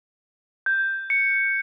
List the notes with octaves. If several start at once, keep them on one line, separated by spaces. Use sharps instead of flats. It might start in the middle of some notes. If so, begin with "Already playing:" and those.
G6
C#7